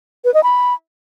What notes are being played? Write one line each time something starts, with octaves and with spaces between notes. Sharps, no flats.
B4
D#5
B5